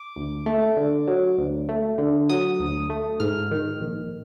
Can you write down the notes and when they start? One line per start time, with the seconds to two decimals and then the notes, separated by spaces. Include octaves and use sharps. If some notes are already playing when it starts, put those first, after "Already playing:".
Already playing: D6
0.16 D2
0.46 A3
0.77 D3
1.07 F#3
1.38 D2
1.69 A3
1.98 D3
2.29 F#3 D#6
2.59 D2
2.90 A3
3.20 G#2 F6
3.51 D#3
3.81 A#1